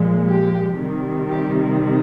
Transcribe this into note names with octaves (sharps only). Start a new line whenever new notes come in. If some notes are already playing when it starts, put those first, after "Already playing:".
Already playing: A#2 F3 G#3
G4
C3 D#3 G3
G4